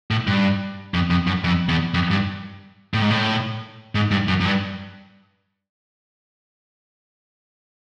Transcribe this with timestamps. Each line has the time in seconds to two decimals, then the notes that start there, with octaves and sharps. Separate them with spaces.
0.11 A2
0.27 G2
0.94 F2
1.10 F2
1.27 F#2
1.44 F2
1.69 E2
1.94 F2
2.11 G2
2.94 A2
3.02 G#2
3.10 A2
3.95 G#2
4.11 G2
4.28 F#2
4.40 F#2
4.45 G2